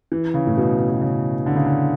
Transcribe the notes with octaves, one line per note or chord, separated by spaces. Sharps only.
E3
C#3
A2
B2
B2
B2
C#3
D3
C#3
D3